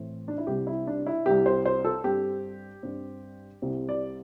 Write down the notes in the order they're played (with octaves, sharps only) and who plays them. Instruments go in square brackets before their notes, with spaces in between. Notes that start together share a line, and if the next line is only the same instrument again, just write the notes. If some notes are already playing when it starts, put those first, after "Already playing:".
Already playing: [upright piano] A2 E3 A3 C4
D4
E4
C2 C3 G3 C4 G4
E4
D4
E4
C2 C3 G3 C4 G4
C5
C5
A4
G2 G3 C4 G4
G2 G3 C4
C2 C3 G3 C4
D5